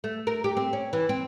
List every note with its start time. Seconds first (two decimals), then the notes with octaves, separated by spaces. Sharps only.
0.04 A3
0.27 A#4
0.44 G4
0.57 C4
0.73 C#4
0.93 E3
1.09 C4